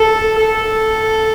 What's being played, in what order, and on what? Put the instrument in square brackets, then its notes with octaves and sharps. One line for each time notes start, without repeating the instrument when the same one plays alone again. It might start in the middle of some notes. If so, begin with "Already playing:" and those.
Already playing: [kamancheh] A4
A4